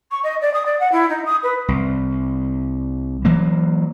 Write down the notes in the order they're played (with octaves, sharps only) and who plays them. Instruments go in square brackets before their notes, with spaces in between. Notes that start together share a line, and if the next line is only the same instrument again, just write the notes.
[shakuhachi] C#6
D#5
D5
D#6
D5
F#5
E4
D#4
D#6
B4
[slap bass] C2
E3 F#3 A#3